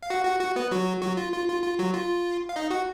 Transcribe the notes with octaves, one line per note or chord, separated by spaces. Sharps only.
F5
F#4 F#5
F#4 F#5
F#4 F#5
B3 B4
F#3 F#4
F#3 F#4
F4
F4
F4
F4
F#3 F#4
F4
F5
D#4 D#5
F#4 F#5